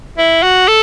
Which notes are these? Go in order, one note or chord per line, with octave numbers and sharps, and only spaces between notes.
E4
F#4
A4